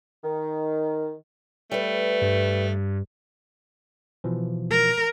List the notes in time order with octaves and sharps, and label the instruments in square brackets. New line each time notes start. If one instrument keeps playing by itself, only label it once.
[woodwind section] D#3
[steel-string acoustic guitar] G3 B4 [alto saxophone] A3
[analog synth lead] G2
[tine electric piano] B2 E3 F3
[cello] A#4